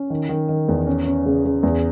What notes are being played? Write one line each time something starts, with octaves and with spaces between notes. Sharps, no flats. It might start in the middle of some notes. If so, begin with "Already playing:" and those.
Already playing: C#4
D#3
D#3
D#3
E2
C#4
C#4
C#3
C#3
E2